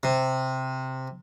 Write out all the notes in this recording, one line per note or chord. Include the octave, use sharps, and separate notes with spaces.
C3